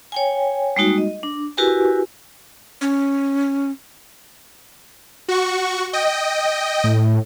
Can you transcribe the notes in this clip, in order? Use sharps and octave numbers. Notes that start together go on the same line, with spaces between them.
C#5 G5 G#5
G3 G#3 A#3 D#4 F#4
D#5
D4
E4 F#4 G4 A#4 B4 G#5
C#4
F#4 C#6
D#5 G5
A2